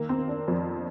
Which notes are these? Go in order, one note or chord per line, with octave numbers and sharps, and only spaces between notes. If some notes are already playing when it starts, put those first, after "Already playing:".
Already playing: D#3 A#3
C4
D#3
D4
F2